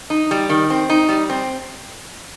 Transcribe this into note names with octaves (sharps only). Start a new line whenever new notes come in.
D#4
G3
D#3
C4
D#4
G3
C4